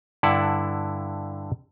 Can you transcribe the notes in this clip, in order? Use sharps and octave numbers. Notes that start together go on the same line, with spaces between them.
G2 D3 E4 D5 F#5 A5